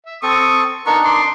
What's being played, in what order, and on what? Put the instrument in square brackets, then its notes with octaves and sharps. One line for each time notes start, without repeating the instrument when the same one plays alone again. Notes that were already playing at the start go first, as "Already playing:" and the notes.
[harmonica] E5
[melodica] C4 A4 [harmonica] C#6 D#6
[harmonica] B3 A#4 C#6 [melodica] D4 D#4
[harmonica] C6 D6